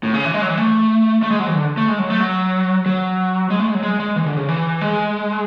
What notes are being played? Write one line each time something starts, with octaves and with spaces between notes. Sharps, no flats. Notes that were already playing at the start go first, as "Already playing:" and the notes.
A2
C#3
E3
G#3
F#3
E3
A3
A3
G#3
F#3
E3
D3
A3
G#3
F#3
A3
F#3
F#3
G#3
A3
G#3
F#3
G#3
G#3
E3
D3
C#3
E3
G#3